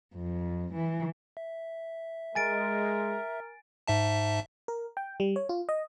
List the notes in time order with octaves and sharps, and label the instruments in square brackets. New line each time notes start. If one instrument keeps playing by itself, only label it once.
[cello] F2
E3
[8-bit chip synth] E5
[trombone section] G#3 [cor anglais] A#4 [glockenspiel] G#5 A6 D7
[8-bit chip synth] G#2 E5 A5
[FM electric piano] A#4
G5
G3
C#5
F4
D#5